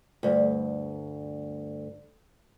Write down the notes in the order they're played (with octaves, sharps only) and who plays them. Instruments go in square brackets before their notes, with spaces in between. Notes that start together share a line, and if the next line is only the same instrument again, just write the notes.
[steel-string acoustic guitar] D2 G2